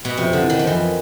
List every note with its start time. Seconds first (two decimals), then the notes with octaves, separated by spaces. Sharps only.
0.05 B2
0.17 F2 C3
0.33 D3
0.41 C3 E3
0.50 D#3
0.59 F3
0.66 F2 E3